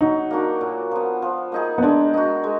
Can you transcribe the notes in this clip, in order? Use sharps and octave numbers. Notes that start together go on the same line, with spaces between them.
F#3 D#4
A#3 D4 F#4
A#2
F3 B3
F3
A#3 D#4 G#4
B3
G#3 D4
D#4 F#4
G#3